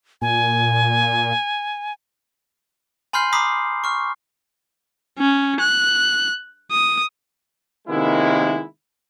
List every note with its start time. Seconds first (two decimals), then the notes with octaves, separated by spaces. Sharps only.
0.22 A#2 G#5
3.13 G#5 B5 C6 F6 G6 C7
3.32 A#5 B5 D6 D#6 B6 C7
3.84 C#6 F6
5.19 C#4
5.60 F#6
6.71 D#6
7.88 C3 D#3 G#3 A#3 B3 E4